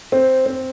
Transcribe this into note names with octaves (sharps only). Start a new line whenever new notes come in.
C4
C4